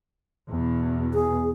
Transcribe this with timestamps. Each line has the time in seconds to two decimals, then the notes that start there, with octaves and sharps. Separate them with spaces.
0.48 E2 B2
1.13 G#4